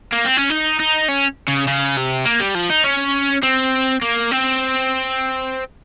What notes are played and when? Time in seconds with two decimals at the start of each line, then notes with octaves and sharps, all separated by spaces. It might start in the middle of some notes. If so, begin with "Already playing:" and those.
0.13 A#3
0.25 C4
0.37 C#4
0.50 D#4
0.80 D#4
1.09 C#4
1.48 C#3
1.67 C#3
1.97 C3
2.25 A#3
2.40 G3
2.55 F3
2.70 D#4
2.84 C#4
3.43 C4
4.02 A#3
4.31 C4